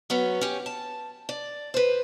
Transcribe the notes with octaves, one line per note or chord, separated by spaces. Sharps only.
F#3 B3 C#4
C#4 G4
A5
D5
B4 C5